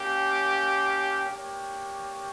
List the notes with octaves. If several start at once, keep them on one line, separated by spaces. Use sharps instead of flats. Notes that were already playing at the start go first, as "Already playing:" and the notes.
Already playing: A#3 C#4 G4
A#3 D4 G4 C#5 G5